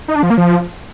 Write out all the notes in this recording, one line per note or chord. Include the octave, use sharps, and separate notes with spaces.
D#4
D4
F3
A#3
F3